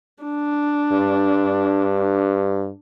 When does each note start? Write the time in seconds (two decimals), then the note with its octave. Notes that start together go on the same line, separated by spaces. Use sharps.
0.23 D4
0.92 G2